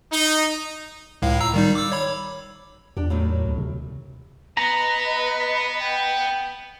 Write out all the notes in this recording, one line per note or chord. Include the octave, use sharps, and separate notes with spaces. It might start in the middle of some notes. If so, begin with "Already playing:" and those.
D#4
C#2 A2 F5
A#5 E6 C7
D#3 G3 D#4
D6 E6
C#5 B5
E2 D4 G4
A2 D#3 F#3
D2
C3
B3 B4 D#5 A#5
G5